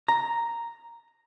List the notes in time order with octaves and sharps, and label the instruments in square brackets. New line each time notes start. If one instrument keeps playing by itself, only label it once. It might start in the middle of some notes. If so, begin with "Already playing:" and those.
[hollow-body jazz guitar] A#5